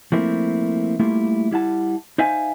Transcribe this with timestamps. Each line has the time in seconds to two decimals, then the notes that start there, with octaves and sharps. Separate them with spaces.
0.12 F3 A3 A#3 C4 E4
0.99 G3 A3 A#3 E4 F4
1.51 G3 E4 F#5 A5
2.18 D#4 C5 E5 F5 G#5